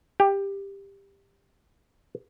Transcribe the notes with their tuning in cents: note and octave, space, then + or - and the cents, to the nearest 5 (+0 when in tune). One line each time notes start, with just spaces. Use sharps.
G4 +15